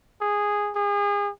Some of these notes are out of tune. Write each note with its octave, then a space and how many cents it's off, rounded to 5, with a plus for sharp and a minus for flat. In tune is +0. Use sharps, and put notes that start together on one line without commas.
G#4 -10
G#4 -35